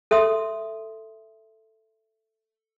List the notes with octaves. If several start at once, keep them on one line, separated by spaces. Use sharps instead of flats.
A4 E5 C6 D#6